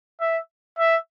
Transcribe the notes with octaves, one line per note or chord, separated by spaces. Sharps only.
E5
E5